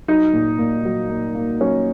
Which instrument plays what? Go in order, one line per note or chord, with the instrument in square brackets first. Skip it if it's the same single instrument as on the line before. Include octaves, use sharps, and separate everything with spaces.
[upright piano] F#3 D#4
A#2
A#2
F#3
A#3
A#3
F#3 C#4